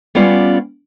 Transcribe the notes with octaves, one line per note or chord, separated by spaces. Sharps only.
G3 B3 C#4 F4 D5